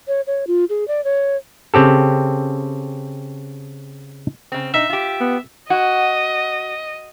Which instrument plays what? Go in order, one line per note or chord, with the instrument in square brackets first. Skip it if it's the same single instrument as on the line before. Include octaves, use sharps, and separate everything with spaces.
[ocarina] C#5
C#5
F4
G#4
D5
C#5
[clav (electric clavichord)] C#3 C4 G4 A4
[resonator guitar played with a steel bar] C#3 C4
[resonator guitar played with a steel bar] D#4 [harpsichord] E5
[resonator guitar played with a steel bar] F4 G4
[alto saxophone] B3
[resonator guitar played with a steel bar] F#4 [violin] D#5